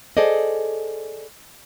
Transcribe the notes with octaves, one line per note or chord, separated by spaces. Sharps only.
G#4 A4 C5 D5 D#5